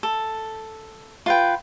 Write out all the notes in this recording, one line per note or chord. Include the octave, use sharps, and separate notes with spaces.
A4
F4 B4 G5